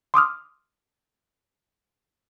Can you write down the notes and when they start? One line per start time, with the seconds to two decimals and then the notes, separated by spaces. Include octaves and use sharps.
0.14 C6 D6 D#6 F6